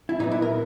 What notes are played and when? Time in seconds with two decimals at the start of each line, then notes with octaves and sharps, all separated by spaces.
0.09 E4
0.19 A#2 F#3 B3 D#4
0.32 E4
0.42 A#4